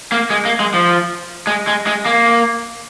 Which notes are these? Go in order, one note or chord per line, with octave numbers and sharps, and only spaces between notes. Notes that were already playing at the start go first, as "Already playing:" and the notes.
A#3
G#3
A#3
G#3
F3
G#3
G#3
G#3
A#3